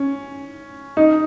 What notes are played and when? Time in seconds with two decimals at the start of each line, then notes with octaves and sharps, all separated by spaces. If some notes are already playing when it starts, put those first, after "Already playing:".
Already playing: C#4
0.97 D#4